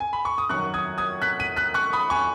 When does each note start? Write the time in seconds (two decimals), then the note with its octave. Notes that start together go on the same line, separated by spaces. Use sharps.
0.00 G#5
0.13 B5
0.25 C#6
0.38 D#6
0.49 F#2 D#3 F#3 C#6 F#6
0.74 D#6 G#6
0.98 D#6 G#6
1.22 F#6 B6
1.40 B6 D#7
1.56 F#6 B6
1.74 C#6 F#6
1.93 B5 D#6
2.10 G#5 C#6